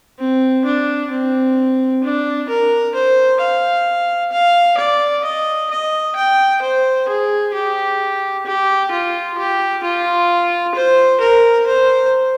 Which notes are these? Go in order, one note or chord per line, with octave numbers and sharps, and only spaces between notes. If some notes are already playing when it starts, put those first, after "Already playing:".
C4
D4
C4
D4
A#4
C5
F5
F5
D5
D#5
D#5
G5
C5
G#4
G4
G4
F4
G4
F4
C5
A#4
C5